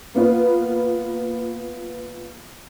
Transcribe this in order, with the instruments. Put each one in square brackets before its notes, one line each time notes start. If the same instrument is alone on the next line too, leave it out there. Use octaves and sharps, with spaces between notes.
[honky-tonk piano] A#3 B3 F4 B4